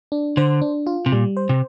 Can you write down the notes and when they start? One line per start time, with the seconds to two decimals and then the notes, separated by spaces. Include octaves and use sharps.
0.12 D4
0.37 D3 C5
0.62 D4
0.87 F4
1.06 C3
1.12 A#2 G3
1.37 C5
1.49 C3